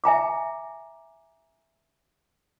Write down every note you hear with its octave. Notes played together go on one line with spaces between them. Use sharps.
E5 G#5 A#5 D6